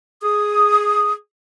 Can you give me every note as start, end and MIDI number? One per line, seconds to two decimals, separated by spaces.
0.23 1.13 68
0.23 1.13 87